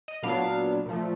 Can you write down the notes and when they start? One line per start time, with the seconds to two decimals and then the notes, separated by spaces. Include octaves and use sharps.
0.08 D#5
0.23 A#2 F#3 B3 D4 F5
0.86 A#2 F3 A3